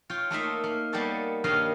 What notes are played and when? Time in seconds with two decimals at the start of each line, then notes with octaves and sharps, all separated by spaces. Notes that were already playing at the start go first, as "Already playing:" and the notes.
0.10 F4 C#5 G5
0.30 A3 A#3 D#4 E5
0.64 A#3
0.92 G3 A#3 B3 G4 A4 C#5
1.44 G2 D#3 A#3 C#5 D#5 F5